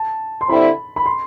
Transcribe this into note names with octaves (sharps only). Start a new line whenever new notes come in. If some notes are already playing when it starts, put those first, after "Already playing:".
Already playing: A5
C6
D3 G3 C4 E4 B5
B5
C6